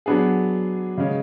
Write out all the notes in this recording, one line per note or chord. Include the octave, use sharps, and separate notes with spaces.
F#3 B3 D4 G#4
C#3 G#3 C#4